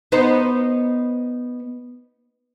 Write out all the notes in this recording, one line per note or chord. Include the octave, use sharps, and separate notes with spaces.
B3 D#4 C5